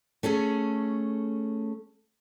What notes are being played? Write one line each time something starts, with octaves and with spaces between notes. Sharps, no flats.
A3 C#4 G#4 A4